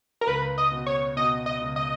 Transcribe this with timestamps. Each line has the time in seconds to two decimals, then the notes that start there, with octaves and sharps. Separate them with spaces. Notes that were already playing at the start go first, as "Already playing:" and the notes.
0.21 A#4
0.27 C#2 B4
0.58 D#5
0.72 B2
0.86 C#5
1.17 B2 D#5
1.46 D#5
1.61 C#2
1.76 D#5